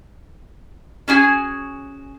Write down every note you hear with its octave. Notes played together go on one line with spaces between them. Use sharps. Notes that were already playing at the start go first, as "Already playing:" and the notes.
C#4 F#4 G#4 G#5